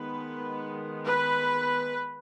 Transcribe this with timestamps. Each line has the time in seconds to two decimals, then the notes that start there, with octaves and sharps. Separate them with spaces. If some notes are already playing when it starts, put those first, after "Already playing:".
Already playing: D#3 G#3 B3 B4
1.07 B4